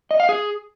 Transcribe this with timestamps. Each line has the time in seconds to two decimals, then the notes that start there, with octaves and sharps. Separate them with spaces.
0.11 D#5
0.20 F5
0.29 G#4